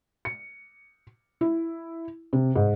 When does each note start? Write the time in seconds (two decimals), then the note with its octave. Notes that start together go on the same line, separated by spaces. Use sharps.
0.25 C#7
1.41 E4
2.33 C3
2.56 G#2